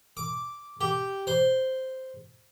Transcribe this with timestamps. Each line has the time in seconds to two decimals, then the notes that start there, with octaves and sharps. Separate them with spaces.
0.17 D6
0.81 G4
1.27 C5